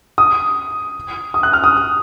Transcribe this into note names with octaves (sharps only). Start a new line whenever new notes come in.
D#6
D#6
F#6
F6
D#6